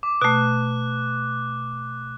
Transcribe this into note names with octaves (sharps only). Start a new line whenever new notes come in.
D6
B2 A3 F#6